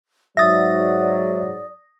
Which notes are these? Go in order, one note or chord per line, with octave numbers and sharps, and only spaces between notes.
G#2 F#3 D5 E5 D#6 A6 A#6